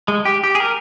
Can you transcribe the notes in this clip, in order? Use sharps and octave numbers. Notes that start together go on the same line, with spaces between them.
G#3
G4
G4
G#4
A#4